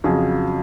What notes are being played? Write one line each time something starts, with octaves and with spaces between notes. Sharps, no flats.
F2 C#3 F#3 G#4